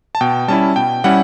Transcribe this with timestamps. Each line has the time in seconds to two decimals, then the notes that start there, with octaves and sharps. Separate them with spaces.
0.15 A5
0.21 B2 G5
0.48 G3 C#4 E4 A5
0.76 B2 G5
1.04 G3 C#4 E4 F#5